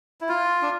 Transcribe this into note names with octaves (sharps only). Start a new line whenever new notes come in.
E4
F4
D4